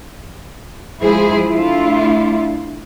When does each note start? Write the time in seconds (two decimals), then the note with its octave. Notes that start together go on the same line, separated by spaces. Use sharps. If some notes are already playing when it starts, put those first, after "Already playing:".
1.00 F3 G#3 E4 G#4 C5
1.50 A3 D4 E4 F4